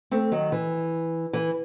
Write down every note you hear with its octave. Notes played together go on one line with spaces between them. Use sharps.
A3 C4
D#3 F#3
E3
E3